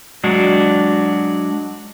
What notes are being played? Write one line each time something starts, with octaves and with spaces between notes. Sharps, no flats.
F#3 G#3 D4 F#4